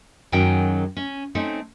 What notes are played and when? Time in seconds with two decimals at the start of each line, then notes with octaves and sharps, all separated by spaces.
0.32 F#2 D#3 F#3 C#4 G#4 G5
0.97 C#4
1.35 A3 C4 C#4 D#4